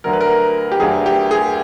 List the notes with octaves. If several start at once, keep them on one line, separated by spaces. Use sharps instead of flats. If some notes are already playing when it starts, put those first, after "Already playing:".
D2 D3 F#3 A#4
B4
A#4
G4
D2 D3 F#3 G#4
G4
G#4